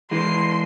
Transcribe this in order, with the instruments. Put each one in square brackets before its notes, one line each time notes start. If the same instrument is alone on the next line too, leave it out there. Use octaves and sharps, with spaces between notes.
[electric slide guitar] E3 G#3 [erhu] C6